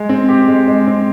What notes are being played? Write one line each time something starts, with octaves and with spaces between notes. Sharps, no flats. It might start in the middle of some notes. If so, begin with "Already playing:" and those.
Already playing: G#3
C4
G4
G#3
G#3
C4